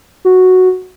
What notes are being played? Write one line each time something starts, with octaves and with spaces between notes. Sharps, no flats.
F#4